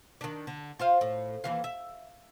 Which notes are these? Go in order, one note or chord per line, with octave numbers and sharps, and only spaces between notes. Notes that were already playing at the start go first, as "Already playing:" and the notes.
D#3 D4
D3
F4 C5 F5
A2
D#2 E3 F5
E5